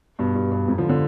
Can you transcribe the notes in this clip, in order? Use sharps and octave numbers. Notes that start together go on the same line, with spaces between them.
G2 B2
G2
G2
F2 G#2
D3 F3
D3 F3